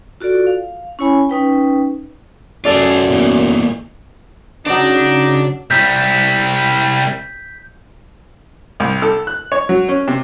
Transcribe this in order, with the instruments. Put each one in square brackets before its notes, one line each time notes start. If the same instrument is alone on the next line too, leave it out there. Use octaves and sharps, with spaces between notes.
[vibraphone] F4 F#4 A4 D5
F5
C#4 E4 C#5 G#5 B5
C#4 D#4 B4 G5
[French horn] F#2 [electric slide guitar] F4 G#4 [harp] A4 D5
[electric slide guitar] E2 A#2
[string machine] C#3 [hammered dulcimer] F#3 D6 [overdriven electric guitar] D4 [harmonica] D#4
[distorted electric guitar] C2 G3 [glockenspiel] G6 B6
[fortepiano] C2
A4
F#6
C#5
F#3
C#4
C3